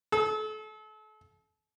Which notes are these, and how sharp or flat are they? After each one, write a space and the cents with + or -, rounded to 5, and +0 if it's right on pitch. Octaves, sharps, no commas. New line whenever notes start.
A4 -35